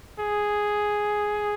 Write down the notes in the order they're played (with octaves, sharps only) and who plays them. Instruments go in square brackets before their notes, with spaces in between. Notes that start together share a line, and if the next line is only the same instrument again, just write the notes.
[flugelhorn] G#4